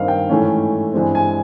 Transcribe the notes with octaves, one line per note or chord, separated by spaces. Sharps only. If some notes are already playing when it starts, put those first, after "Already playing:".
Already playing: G2 D#3 G3 C4 D#4 F5
G5
G#2 E3 A3 C#4
G2 E3 G#3 C4
G#5